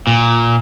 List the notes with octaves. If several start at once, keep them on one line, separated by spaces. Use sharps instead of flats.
A#2